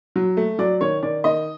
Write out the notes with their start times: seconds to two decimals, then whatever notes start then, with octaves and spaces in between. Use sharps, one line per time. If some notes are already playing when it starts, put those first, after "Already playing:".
0.16 F#3
0.37 A3
0.59 F#3 D5
0.81 D#3 C#5
1.03 D#3 D5
1.24 D#3 D#5